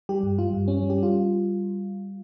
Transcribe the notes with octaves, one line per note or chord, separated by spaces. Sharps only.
G3 G4
G2
G3 F4
G2
G3 C#4
G3
G4
G3 F4